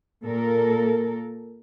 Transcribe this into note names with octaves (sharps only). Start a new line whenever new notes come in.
A#2 A4 A#4